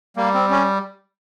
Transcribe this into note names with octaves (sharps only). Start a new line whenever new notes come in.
G3 A#3
C4
C#4